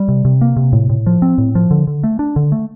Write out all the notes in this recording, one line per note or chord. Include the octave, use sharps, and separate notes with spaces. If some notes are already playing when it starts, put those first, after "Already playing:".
Already playing: G3
C3
C3
A#3
C3
A2
A2
F3
C4
A2
F3
D3
D3
A3
D4
D3
A3